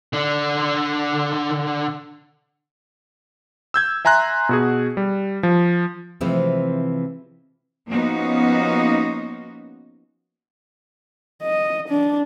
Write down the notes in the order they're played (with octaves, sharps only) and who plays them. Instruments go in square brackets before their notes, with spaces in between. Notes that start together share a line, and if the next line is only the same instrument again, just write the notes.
[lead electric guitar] D3 D4
[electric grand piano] E6 G6 G#6
E5 G#5 A#5 C6 F#6
B2 F#4 G#4
G3
F3
[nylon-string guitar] C3 E3 F3 G#3 A3 C4
[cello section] F3 A#3 B3 C#4 D#4 F#4
[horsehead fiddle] D#5
D4